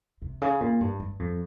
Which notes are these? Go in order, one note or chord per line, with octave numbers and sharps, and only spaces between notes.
C3
C#3
A#2
G2
G2
F2